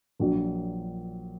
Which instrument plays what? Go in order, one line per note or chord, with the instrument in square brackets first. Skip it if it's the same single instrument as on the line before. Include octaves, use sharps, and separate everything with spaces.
[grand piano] A#1 A#2 F#3